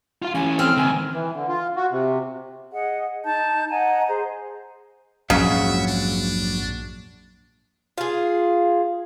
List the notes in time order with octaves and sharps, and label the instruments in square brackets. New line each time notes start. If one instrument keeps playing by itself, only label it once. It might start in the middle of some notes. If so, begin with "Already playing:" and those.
[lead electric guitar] F4 F5
[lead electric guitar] E3 C#4 [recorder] G#5
[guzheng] C4 [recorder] F6
[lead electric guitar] C#2 D#3 [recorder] G#5
[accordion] E3
D3
F4
F#4
C3
[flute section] G#4 D#5 F#5
D#4 D#5 A5 G6
D#5 F#5 G#5 A#5
G#4 C5 A#5
[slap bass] A#1 F2 G#2 [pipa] C#3 [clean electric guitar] F#3 F#4 [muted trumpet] E5
[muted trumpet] D4
[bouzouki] F4 G#4